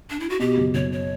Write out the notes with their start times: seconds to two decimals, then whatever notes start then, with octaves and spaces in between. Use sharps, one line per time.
0.10 D4
0.20 E4
0.30 F#4
0.39 B2 G4
0.58 F#1
0.75 F#1 C#5
0.92 C#5